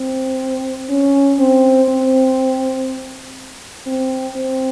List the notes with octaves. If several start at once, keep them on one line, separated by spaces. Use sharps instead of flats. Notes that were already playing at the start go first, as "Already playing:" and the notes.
Already playing: C4
C#4
C4
C4
C4
C4